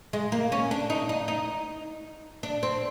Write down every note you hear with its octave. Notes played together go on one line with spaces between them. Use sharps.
G#3
A#3
C#4
D4
D#4
D#4
D#4
D4
C4